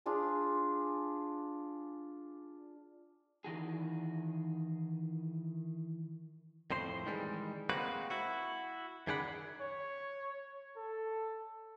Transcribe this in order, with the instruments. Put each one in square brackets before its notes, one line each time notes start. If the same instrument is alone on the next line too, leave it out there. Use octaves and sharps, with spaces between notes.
[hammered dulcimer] D4 F4 G#4 D5
[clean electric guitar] D#3 E3 F#4 G#4
F2 A2 C5 C6
D#3 E3 G3 G#3
G#3 A#3 C4 F#4 B4
E4 F#4
F#2 D#3 G#4 D5 F#5 B5
[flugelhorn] C#5
A4